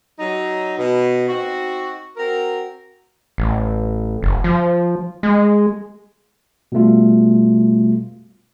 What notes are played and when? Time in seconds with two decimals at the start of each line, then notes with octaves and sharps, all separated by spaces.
0.18 F#3 D#4
0.78 B2
1.29 C4 D#4 F#4
2.17 C4 F#4 A#4
3.38 A1
4.23 F#1
4.44 F3
5.23 G#3
6.72 B2 G3 A3 F4